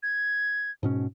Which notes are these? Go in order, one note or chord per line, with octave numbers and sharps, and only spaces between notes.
G#6
G#2 B2 C#4